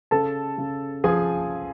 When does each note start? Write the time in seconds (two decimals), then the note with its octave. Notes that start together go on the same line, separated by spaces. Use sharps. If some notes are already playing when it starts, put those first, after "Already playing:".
0.11 C#3 A4 A5
0.58 C#3
1.04 F3 G#4 G#5